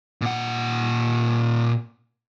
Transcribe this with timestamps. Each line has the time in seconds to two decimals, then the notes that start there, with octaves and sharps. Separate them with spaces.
0.21 A#2 F#5